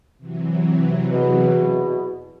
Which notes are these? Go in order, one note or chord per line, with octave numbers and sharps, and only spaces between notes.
C3 E3 F#3
E2 B2